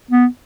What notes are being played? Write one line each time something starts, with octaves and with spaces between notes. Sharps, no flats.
B3